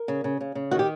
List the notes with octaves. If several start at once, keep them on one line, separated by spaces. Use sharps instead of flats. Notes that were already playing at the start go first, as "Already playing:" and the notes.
Already playing: A#4
C#3
C#3
C#3
C#3
D#3 F#4
G4